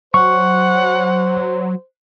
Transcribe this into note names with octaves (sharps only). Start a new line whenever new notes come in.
F#3 C5 F#5 C#6